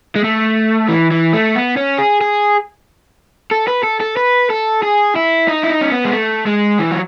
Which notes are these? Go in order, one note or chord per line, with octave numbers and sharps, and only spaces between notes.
G#3
A3
E3
E3
A3
B3
C#4
G#4
G#4
A4
B4
A4
A4
B4
A4
G#4
E4
D#4
E4
D#4
C#4
B3
G#3
A3
G#3
E3
F#3